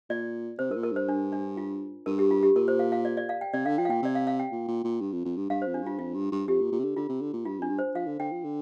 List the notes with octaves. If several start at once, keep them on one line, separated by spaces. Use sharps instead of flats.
A#2 D5
C3 C5
G2 A#4
A#2
A#4
G2 C5
D4
D4
F4
G2 A#4
G4
F4
G4
A#2 A#4
C5
F5
F5
D5
D5
F5
G5
C3 D5
D3 F5
F3 G5
F5
A#2 G5
C3 D5
F5
F5
G5
A#2
A#2
A#2
G2
F2
F2
G2
G2 F5
F2 C5
D4
G2 F4
F2 F4
G2
G2
F2 G4
A#2
A#2
C3
D3
D3 F4
C3
D3
A#2
G2 F4
F2 D4
G2
C5
F3 F5
D3
D3 G5
F3
D3